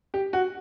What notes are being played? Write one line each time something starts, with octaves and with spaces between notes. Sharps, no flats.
G4
F#4